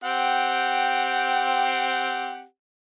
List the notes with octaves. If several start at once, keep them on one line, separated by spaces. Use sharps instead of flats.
C4 G4 F#5